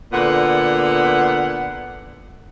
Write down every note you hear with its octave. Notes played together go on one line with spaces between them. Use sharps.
A#2 D3 B3 F#5